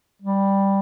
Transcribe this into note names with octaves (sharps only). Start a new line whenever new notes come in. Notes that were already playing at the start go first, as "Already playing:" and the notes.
G3